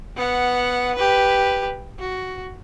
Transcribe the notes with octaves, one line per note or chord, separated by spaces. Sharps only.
B3 F#5
G4 B4
F#4